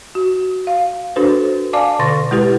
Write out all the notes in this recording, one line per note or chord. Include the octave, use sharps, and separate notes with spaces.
F#4
F5
D4 F#4 A4 B4 C5
D5 F5 G#5 A5 D6
B2 D3 C6 C#6 A6 A#6
G#3 E4 G4 B4